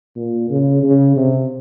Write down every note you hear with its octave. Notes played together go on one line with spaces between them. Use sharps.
A#2
C#3
C#3
C3